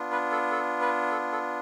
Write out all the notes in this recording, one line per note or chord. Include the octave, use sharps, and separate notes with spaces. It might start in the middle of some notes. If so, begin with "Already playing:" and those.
Already playing: B3 D4 F4
B4
A4
A4
B4
A4
A4